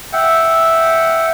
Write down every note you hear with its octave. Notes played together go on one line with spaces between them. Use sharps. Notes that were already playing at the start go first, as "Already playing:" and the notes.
E5 F#5 G5